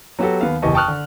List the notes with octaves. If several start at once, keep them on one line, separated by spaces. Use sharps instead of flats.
F#3 B3 F#4 G4 A4
D#2 B3 F5
F#1 E2 G4 D#5 A5 C#6
G5 A5 C#6 D#6 F6 F#6
D3